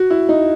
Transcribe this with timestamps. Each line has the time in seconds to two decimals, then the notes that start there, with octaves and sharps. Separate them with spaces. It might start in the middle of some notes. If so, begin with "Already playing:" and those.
Already playing: F#4
0.10 E4
0.29 D#4